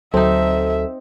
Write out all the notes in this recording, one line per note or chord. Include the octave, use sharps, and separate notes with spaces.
D2 F#3 C4 D#4 A4 E5